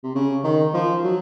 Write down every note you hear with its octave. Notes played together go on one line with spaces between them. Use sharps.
C3
C#3
D#3
F3
F#3